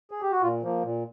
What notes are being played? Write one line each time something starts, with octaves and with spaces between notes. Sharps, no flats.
G#4
G4
F#4
A#2 F4
F3 A#3
A#2